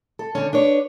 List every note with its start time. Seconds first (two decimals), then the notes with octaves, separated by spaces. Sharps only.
0.19 A4
0.35 D3 C#4
0.53 D4 B4 C#5